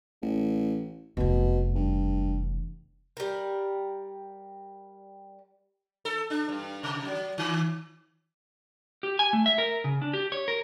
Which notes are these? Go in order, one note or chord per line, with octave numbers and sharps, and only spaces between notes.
A1
F1 E2 B2
G2
G3 A#4
A4
D4
G2
C3
F#3
D#3
G4
G#5
A3
E5
A#4
C#3
D4
G4
C#5
A#4